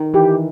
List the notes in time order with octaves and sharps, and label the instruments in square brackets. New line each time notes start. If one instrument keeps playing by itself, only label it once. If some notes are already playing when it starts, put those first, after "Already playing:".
Already playing: [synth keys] D#3
[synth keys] E3 [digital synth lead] G4